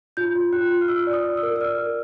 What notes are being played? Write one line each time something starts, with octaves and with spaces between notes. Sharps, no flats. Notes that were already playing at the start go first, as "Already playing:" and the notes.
F4 G6
F4
F4 F#6
F4
F6
F4 E6
D5
D#6
D5
E6
A#4
E6
D5 F6
A#4